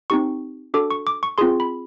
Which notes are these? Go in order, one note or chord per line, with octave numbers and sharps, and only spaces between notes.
C4 D#4 G4 C#6
D4 F#4 A4 D6
C#6
D6
C#6
C4 F4 G#4 C6
B5